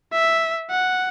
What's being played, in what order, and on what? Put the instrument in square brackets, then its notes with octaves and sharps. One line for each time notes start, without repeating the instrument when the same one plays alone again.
[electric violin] E5
F#5